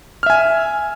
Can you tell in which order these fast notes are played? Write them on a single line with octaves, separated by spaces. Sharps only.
F6 E5 G#5